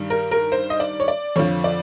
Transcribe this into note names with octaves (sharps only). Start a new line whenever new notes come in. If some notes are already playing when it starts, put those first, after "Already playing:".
Already playing: G2 D#3 G3
A#4
A#4
C5
D#5
D5
C#5
D5
F2 D3 F3 C#5
D5